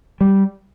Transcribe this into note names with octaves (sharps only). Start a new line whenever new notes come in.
G3